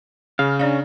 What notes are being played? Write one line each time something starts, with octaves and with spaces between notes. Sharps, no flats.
C#3 F5
C#4 D4 D5 F5